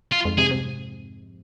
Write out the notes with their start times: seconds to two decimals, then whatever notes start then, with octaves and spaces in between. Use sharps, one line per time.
0.12 F4
0.25 F2 G#2
0.38 G#2 C3 G#4
0.51 C3